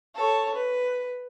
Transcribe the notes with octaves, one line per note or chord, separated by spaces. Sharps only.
A4 C#5
B4